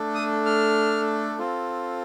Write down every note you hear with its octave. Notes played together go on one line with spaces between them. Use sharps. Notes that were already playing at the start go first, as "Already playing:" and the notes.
Already playing: A3 D4 A4
D#6
F6
C4 F4 A4